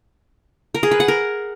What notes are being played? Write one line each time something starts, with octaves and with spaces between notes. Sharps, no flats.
A#4
G#4
B4
F#5
A#4